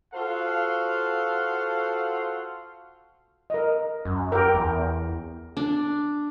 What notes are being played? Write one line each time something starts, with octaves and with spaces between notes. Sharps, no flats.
F4 F#4 A4 C5 F5 F#5
A#4 D#5
F#2
G4 A#4 G5
E2
D4